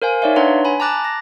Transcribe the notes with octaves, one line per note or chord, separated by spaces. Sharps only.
A#4 C5 F5 G#5
D#4 C#5 D5 E5 F5
D4 B4 C#5 F#5 A#5 C6
G#5 B5
A5 A#5 D6 F#6 A6
A#6